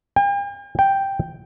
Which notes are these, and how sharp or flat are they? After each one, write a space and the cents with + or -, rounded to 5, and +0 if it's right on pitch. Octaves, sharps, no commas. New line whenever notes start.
G5 +45
G5 +0